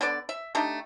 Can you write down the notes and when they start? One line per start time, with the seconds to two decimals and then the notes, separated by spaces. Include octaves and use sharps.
0.01 D3 B3 A4 D5
0.29 E5
0.55 A3 D4 D#4 G4